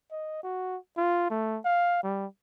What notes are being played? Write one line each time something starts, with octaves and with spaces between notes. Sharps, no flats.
D#5
F#4
F4
A3
F5
G3